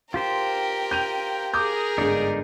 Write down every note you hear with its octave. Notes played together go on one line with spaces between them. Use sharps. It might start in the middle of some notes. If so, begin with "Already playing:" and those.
F4 G4 A#4 C5 G5
G6 D#7 F7
G#4 A#4 D6 D#6 G6
G1 G#2 D#4 D5